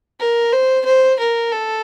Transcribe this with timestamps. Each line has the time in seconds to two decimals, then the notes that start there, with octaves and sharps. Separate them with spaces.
0.20 A#4
0.52 C5
0.85 C5
1.19 A#4
1.52 A4